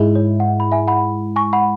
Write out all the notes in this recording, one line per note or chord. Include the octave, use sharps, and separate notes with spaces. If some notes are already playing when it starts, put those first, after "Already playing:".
Already playing: G#2 G#3 E4
C#5
F#5
B5
E5 G#5
F#5 B5
G#5 C#6
F#5 B5